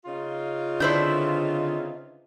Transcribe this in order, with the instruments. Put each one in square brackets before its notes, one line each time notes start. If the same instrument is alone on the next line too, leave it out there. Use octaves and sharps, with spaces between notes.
[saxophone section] C#3 D#4 F4
[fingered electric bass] D3 [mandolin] C4 E4 G6 [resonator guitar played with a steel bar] D4 B4 C5